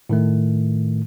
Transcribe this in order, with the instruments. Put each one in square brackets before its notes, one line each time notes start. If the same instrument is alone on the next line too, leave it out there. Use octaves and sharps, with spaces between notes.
[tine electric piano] A2 D#3 A3